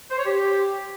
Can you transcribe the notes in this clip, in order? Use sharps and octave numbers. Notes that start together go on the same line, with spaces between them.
C5
C#5
G4